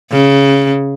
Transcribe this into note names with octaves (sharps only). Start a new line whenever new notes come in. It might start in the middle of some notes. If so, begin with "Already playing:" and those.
C#3